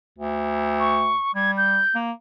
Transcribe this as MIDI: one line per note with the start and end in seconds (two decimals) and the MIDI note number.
0.18 1.15 38
0.80 1.34 85
1.35 1.80 55
1.35 1.51 92
1.57 1.95 91
1.95 2.12 58